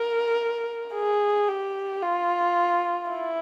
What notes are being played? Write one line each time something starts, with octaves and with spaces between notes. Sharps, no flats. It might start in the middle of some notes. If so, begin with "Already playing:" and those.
Already playing: A#4
G#4
G4
F4
E4